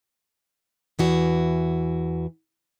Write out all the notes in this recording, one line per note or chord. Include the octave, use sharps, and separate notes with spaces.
E2 E3 F#4